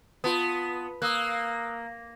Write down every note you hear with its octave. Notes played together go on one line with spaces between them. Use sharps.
B3 F4 A5 D#6
A#3 D#6 E6 F#6